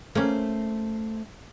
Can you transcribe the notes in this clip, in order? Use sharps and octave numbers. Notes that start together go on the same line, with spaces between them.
A3 A#3 C#4 C5